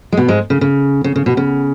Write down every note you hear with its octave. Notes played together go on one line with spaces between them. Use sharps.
G#3
B2 B3
G#2 G#3
C#3
C#3
C#3
C#3
B2
C#3